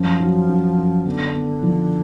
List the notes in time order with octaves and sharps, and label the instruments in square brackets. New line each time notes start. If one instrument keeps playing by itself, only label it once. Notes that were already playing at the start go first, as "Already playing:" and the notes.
Already playing: [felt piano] F#2 [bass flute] F3
[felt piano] F#3
F#2
F#2
[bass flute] D3 [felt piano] B3
[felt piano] B3
F3